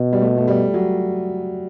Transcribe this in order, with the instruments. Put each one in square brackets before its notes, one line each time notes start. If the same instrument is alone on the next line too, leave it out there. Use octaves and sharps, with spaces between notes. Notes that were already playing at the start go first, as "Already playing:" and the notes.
Already playing: [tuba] B2
[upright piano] G3
A3
A3
G3
F#3